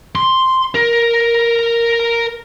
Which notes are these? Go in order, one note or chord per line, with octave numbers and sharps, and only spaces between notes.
C6
A#4